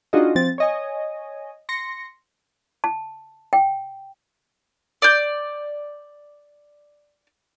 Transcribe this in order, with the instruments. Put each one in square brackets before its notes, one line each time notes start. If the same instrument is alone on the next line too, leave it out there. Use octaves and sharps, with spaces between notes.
[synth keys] D4 D#4 F4 F#4 G#4 D#5
F3 C4 A6
C#5 D#5 G#5
C6 A#6 C#7
[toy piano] A5
G5
[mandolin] D5 G6